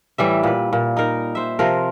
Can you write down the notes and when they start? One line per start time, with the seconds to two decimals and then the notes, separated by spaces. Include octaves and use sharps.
0.18 A2 E3 G3 E5
0.43 A#2 B4
0.73 A#2
0.97 D#4 A#4
1.35 C5 E5
1.59 C3 F3 A#4